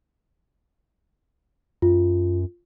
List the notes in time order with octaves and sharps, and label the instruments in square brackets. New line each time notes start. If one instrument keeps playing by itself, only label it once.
[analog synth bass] F#2 [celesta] F4